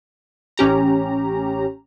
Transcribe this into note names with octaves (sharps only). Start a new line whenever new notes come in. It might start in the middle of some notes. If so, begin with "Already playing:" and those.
A1 C#4 G4 A#5